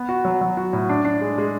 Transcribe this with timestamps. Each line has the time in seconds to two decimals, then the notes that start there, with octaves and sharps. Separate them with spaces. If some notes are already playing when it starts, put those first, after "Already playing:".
Already playing: B3
0.09 F#4
0.25 F#3
0.41 F#3
0.57 F#4
0.73 A2
0.89 D4
1.05 D4
1.21 G#3
1.38 G#3